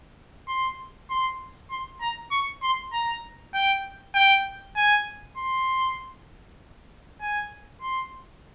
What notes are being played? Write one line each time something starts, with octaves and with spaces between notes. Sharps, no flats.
C6
C6
C6
A#5
C#6
C6
A#5
G5
G5
G#5
C6
G#5
C6